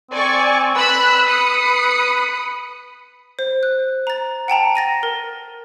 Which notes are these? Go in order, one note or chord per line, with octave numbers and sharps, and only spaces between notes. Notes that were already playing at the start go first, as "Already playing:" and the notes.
C4 D5 G#5 C#6
B4 B5 E6 F#6
B5 D#6 C#7
C5
F#6
A#5 A6
F#5 G5 A5 A#5
A6 A#6 D#7
A#4